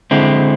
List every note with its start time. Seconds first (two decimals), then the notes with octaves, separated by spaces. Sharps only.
0.11 D3 G#3 C4 E4